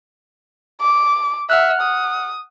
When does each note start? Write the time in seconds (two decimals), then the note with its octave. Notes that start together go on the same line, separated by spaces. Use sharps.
0.81 D6
1.50 E5 F#5 F6 F#6
1.81 D#6